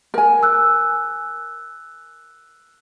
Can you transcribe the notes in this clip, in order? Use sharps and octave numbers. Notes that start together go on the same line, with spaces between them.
A#4 G#5
E6 F#6